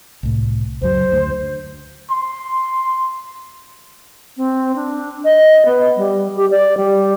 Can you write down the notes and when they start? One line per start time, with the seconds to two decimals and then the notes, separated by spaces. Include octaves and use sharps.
0.23 C2 A2
0.81 C#2 F#2 F#3 C5
1.12 D2
2.11 C6
4.37 C4
4.75 D4
5.24 D#5
5.65 B3
5.96 G3
6.36 G4
6.50 D5
6.77 G3